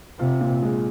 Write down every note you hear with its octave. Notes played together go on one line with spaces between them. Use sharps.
C3 F4
A#2
G#3